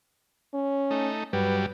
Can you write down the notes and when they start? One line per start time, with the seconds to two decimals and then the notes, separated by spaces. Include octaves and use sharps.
0.54 C#4
0.91 A3 D#4
1.33 G2 F#3 G3 B4